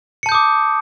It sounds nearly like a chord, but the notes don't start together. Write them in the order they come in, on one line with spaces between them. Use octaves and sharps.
C#7 A5 G6 D#6 D6